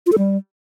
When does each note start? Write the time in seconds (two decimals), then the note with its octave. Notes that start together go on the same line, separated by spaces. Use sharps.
0.06 F4
0.12 A4
0.18 G3